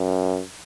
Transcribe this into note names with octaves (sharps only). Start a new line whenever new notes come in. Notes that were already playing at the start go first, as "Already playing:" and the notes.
Already playing: F#2